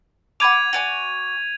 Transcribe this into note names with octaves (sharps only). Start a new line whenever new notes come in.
F#5 B5 D6 G#6 D#7 F7
F#4 D5 G#5